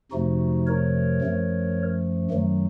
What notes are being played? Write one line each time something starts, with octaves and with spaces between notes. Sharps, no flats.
F2 C3 F3 A3 D#4 F#4
A#4 C#5
F#2 F3 A3
F#2 D#3 F#3 A3